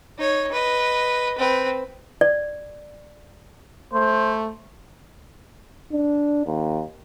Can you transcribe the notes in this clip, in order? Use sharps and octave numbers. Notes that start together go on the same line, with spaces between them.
D#4 C#5
B4 D#5
C4 B4
D5
A3 C5
D4
D#2